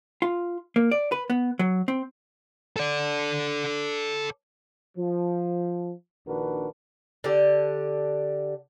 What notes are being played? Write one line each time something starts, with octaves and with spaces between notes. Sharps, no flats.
F4
A#3
D5
B4
B3
F#3
C4
A4 D5
F3
A#1 D#3 D4 F#4 A#4 B4
D3 G4